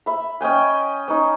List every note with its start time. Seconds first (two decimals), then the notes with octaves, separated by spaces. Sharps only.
0.06 E5 B5
0.41 C#4 D#5 G5 G#5
1.08 C#4 D#4